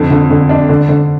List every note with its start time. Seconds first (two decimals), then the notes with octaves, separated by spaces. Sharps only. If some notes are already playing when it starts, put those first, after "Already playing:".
Already playing: F2 D3
0.10 D3
0.30 D3
0.49 D4
0.69 D3
0.89 D3